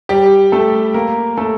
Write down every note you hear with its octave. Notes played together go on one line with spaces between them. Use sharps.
G3 G4
A3 A4
A#3 A#4
A3 A4